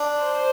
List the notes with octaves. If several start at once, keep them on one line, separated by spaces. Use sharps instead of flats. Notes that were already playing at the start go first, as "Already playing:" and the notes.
Already playing: D4
C5